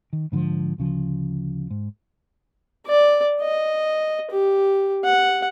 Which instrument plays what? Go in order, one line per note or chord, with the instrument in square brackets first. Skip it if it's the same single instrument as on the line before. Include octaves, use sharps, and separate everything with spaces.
[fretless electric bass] D#3
G#2 D3 E3 F3
D2 C#3 F3
G#2
[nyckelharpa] D5
D#5
G4
F#5